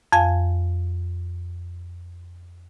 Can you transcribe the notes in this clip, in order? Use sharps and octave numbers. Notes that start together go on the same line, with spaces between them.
F2 F5 G#5